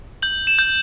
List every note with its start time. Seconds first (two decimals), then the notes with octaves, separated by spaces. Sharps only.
0.22 G6 F#7
0.47 E7
0.59 G6